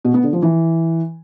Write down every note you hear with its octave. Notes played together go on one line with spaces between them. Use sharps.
B2
B3
D3
F3
E3